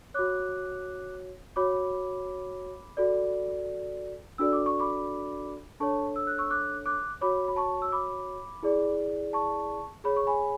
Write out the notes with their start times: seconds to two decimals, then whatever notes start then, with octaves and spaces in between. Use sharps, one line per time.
0.14 F#4 C#5 D6 F#6
1.56 F#4 C#5 B5 D6
2.97 F#4 A4 D5
4.38 D4 F#4 A4 D5 E6
4.53 D6
4.66 C#6
4.80 B5 D6
5.80 D4 A4 C#5 A5 C#6
6.16 E6
6.27 F#6
6.38 C#6 E6
6.50 D6 F#6
6.86 D6 F#6
7.21 F#4 C#5 B5 D6
7.48 B5
7.56 A5 C#6
7.82 E6
7.92 B5 D6
8.63 E4 G#4 D5
9.33 A5 C#6
10.04 G#4 C#5 B5
10.17 C#6
10.27 G#5 B5